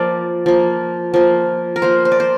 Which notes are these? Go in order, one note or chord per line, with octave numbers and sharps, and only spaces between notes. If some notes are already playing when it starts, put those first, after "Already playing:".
Already playing: F3 A#3 D5
F3 A#3
F3 A#3
A#4
F3 A#3 C5
C5
D5
C5